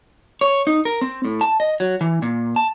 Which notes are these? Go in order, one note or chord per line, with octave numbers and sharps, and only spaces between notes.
C#5
D#4
A#4
C4
A2
A5
D#5
F#3
E3
A#2
A5